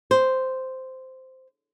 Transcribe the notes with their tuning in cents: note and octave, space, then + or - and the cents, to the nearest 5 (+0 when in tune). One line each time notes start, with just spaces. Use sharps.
C5 -10